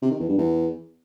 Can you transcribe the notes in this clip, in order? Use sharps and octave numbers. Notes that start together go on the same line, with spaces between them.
C3
D#3
E2
G2
E2